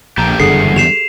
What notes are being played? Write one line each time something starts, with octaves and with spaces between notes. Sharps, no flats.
A#1 G4 A4 A#5
F#1 E2 G2 D3 G#4 A4 F#5 C7
G4 C7 E7 F7